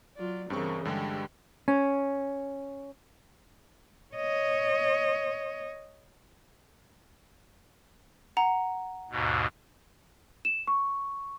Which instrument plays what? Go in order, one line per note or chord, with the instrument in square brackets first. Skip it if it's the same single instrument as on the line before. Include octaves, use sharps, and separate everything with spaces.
[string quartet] F#3 F4 D5
[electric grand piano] G2 C4 C#6 [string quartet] C#3 E3 A#3
[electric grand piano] G2 D3 G#3 [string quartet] G4
[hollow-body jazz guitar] C#4
[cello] C#5 D#5
[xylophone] F#5 A#5
[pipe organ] D#2 G#2 B2
[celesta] E7
C#6